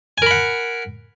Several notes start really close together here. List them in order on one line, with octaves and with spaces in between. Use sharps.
G#5 A#4 B5 F#5